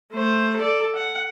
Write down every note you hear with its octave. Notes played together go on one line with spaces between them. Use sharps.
A3 C5
A4 D5
F#5